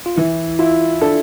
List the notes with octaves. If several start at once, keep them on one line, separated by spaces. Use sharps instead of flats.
F4
E3 E4
E4 F4
D4 A4